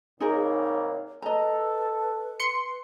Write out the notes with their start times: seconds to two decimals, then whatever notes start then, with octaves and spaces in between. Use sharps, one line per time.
0.20 C2 G#2 A#3 D#4 G#4 A#4 C#5
1.22 A4 B4 D#5 A#5
2.40 C6 C#7